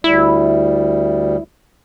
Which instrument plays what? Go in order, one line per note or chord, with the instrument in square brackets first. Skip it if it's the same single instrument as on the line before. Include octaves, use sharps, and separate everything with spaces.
[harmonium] D2 G3 [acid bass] E4